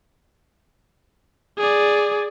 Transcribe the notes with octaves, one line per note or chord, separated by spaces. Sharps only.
G#4 D5